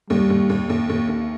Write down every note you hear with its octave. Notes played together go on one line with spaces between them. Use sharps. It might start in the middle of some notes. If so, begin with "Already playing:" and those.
D#2 G3
D#2
D#2
D#2
D#2
D#2